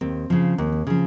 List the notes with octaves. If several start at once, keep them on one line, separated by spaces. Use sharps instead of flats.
D#2 C4
C#3 F3
D#2
C#3 F3